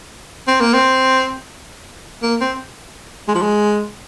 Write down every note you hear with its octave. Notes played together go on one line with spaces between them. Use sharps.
C4
A#3
C4
A#3
C4
G#3
F3
G#3